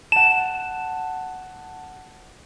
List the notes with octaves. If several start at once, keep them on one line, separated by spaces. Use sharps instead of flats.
F#5 A5 E7